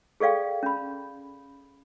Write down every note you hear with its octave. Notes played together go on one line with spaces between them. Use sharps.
G#4 A4 D5 F5 G5
C#4 B5